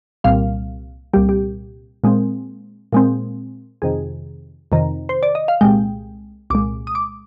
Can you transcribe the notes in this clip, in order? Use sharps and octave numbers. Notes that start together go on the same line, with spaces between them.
C2 A#2 G3 F5
C2 A#2 G3 G4
G4
A#2 G#3 C4
A#2 G#3 C4
F2 C3 D#3 G#4
F2 C3 D#3
C5
D5
D#5
F5
C2 A#2 G#3 G5
C2 A#2 G#3 D6
D#6
D6